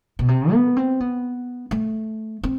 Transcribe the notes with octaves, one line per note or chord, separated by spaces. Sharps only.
B2
C3
B3
C4
B3
A3
C4